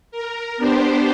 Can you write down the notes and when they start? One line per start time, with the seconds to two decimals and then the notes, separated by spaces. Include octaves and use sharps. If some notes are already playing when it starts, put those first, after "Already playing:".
0.11 A#4
0.57 B3 D4 G4 C5